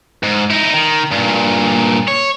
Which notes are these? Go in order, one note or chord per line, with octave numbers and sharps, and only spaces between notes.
G#2
D#4 E4
D#3
G2 A#2
C#5